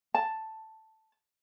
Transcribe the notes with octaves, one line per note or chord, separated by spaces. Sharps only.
A5